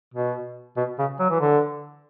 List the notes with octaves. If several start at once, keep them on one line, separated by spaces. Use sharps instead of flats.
B2
B2
C#3
F#3
E3
D3